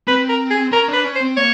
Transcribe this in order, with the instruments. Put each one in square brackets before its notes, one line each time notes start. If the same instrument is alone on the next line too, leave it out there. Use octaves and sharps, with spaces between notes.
[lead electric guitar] C4 [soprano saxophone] B4
[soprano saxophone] A#4
G#4
[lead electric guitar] C#4 [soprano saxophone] A#4
[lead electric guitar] D4 [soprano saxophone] B4
[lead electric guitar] C#4
[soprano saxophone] C5
[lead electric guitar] C4
[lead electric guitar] A#3 [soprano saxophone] C#5